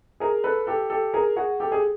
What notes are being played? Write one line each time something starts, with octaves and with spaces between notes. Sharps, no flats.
G#4 A#4
A4 B4
G4 A4
G4 A4
G#4 A#4
F#4 G#4
G4 A4
G#4